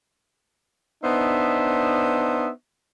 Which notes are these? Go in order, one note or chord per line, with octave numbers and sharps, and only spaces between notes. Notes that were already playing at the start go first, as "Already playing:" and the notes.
B3 D4 D#4 C5 E5